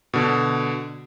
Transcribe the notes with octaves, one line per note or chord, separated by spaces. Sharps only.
B2 D3